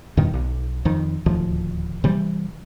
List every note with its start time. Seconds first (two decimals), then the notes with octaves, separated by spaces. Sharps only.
0.17 E2 G2 B2 D#3
0.34 B1
0.85 F2 D#3
1.26 D1 D#2 F3
2.04 C3 E3 G3